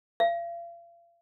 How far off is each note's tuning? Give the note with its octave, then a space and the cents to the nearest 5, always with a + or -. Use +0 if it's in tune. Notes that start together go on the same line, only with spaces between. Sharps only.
F5 -40